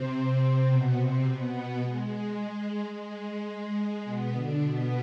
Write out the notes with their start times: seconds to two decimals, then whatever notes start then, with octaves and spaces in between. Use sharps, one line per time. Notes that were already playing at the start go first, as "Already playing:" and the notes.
Already playing: C3 C4
0.67 B2 B3
0.95 C3 C4
1.23 B2 B3
1.79 G#3
2.91 G#3
4.04 B2 B3
4.31 D3 D4
4.60 B2 B3